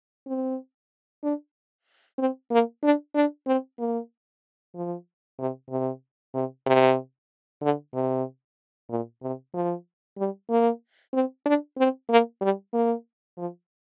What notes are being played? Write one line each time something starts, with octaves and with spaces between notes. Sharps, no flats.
C4
D4
C4
A#3
D4
D4
C4
A#3
F3
C3
C3
C3
C3
D3
C3
A#2
C3
F3
G3
A#3
C4
D4
C4
A#3
G3
A#3
F3